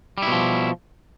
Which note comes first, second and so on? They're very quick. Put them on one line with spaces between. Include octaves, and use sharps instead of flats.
G3 E4 B2 F3